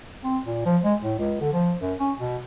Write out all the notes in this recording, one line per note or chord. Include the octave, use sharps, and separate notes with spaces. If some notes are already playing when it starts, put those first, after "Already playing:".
C4
A#2
F3
G#3
A2
C#2
D3
F3
F#2
C#4
B2